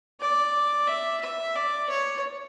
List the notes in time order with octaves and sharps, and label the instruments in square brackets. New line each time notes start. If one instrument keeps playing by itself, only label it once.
[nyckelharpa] D5
E5
E5
D5
C#5